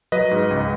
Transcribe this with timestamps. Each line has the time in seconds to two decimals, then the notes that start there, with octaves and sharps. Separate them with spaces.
0.12 F#3 B4 D#5
0.31 G#2
0.51 C#2